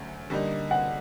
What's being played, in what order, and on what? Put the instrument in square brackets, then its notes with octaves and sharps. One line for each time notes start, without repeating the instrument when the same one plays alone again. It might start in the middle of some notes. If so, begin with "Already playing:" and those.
Already playing: [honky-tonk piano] D2 F#3 A3 C#4
D3 G3 A#3 D#4
[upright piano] F#5